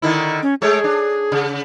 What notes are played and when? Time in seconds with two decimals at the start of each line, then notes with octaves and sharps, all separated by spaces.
0.02 D3 D#3 E4
0.42 C#4
0.62 G#3 A3 G#4 C#5
0.84 D4
1.32 C#3